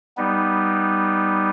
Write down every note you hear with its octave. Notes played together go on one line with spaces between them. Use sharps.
G3 B3 D#4